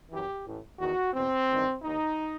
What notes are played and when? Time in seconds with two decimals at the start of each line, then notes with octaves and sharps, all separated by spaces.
0.11 F#2 E3 G4
0.45 A1 A2 E3
0.79 E2 D#3 F#4
1.13 E2 B2 C4
1.48 A1 G2 D#3
1.82 D#2 D#3 D#4